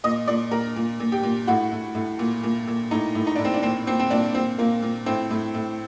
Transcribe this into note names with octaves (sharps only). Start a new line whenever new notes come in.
A#2 D#5
A#2 D5
A#2 A#4
A#2
A#2
G4
A#2
A2 F#4
A2
A2
A#2
A#2
A#2
A2 D#4
A2
D#4
A2 D4
C4
D4
A#2 C4
A#2 C4
C4
A#2 D4
A#2 C4
A#2 A#3
A#2
A2 C4
A2
A2